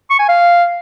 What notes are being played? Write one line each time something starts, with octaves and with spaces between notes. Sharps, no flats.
C#6
G#5
F5